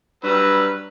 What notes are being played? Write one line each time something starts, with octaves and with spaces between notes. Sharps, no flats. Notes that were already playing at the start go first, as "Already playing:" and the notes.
G2 F#3 G3 B4 E6